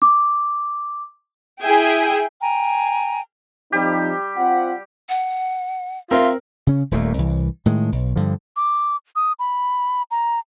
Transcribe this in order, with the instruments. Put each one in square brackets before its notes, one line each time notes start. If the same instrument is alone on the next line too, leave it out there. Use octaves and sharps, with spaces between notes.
[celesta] D6
[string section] E4 G#4 E5 G5 G#5
[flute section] G5 G#5 A#5
[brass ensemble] F3 C4 D#4 [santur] G3 G4
[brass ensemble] C4 F4 F#5
[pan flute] F#5
[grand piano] C4 [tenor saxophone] F4 [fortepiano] A#4 [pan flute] E5
[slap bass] C#3 C#4
D#1 D#2 A#2 A3
C2 E3
A2 D#3 G#3
B1
G2 D3 F3
[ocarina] D6
D#6
B5
A#5